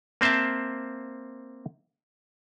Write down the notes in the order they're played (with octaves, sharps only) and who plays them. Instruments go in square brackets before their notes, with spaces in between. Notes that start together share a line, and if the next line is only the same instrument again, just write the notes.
[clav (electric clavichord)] A#3 C4 C5 E5 A5